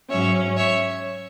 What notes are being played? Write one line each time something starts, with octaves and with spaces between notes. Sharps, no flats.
G#2 F#3 C#4 C#5 E5
C#5 E5